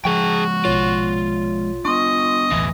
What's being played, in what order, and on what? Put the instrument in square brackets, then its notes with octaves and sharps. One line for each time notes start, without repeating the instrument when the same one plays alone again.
[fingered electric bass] F3 G#3 [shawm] F#4 [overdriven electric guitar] G#4 G5
[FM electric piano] A#1 B2 C#5 [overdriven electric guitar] F4
[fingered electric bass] B3 D4 [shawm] D#5 [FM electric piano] C6 C#6
[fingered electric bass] B1 E2 A2 [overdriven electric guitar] E3